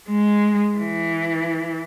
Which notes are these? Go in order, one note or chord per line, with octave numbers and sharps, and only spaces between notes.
G#3
E3